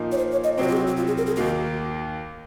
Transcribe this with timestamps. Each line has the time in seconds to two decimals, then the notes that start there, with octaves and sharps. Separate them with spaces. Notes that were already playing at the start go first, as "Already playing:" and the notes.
Already playing: A#2 F3 A#3 D#4
0.12 C#5
0.18 C5
0.32 C#5
0.44 D#5
0.57 C2 C3 F#3 C4 F#4 C5
0.68 F4
0.73 G#4
0.77 F#4
0.87 F#4
0.97 F4
1.07 G#4
1.17 A#4
1.27 G#4
1.36 D#2 D#3 A#3 F#4